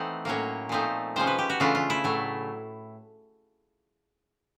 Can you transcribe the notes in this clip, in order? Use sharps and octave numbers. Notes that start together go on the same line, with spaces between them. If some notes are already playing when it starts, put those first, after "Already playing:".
Already playing: E3 A3 C4 D#4 F#5
A2 F#3 A#3 C#4 C#5
A#2 F3 A3 C4 D#4
C3 F3 G#3 C#4 C5
B4
G4
F#4
C#3 E3 A3 D4 F4
F4
E4
A2 F#3 A3